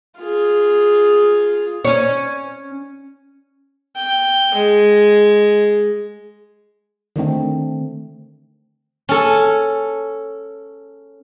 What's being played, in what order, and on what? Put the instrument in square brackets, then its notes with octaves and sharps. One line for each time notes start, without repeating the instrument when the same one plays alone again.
[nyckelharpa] F4 G#4
[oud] C#4 C#5
[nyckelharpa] G5
G#3
[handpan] D3 D#3 A3 C4
[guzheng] C#4 A4